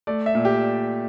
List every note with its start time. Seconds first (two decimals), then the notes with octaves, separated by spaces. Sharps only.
0.07 A3 D5
0.26 E5
0.35 A#2
0.45 G4